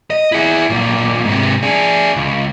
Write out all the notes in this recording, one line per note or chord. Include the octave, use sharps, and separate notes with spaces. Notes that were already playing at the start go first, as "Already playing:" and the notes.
D#5
E4 G#4
B1 A#2
G#2 C3
D4 G#4
C#2